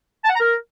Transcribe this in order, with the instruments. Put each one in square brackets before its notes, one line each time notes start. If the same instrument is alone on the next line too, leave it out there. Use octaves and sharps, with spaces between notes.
[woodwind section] A5
F#5
A#5
A#4